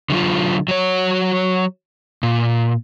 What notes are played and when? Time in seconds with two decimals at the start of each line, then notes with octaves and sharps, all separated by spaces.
0.10 D3 F#3 F4
0.68 F#3 C#5
2.23 A#2